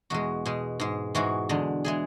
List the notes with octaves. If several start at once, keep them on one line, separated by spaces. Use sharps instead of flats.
E2 B2 G#3 F#4
B2 G#3
G#2 G#3
G#2 E3 G#3 F#4
E2 D3 G#3
E3 G#3 G#4